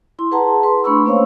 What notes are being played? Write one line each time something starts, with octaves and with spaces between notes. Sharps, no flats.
E4 C6
G#4 B4 F#5 A5 A#5
B4 C6
A3 D4 B4 B5 C#6 E6
A#3 C#4 C5 C#5 F5